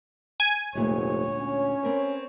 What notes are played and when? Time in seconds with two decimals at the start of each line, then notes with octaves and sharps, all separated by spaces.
0.40 G#5
0.75 F1 D2 A#2 G#3 C#5
1.38 C#4
1.83 C4 A#4 B4